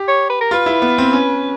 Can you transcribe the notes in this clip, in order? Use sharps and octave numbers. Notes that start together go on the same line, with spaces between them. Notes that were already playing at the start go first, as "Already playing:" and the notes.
Already playing: G4
C#5
B4
A#4
F4 B4
E4
B3
C4
C#4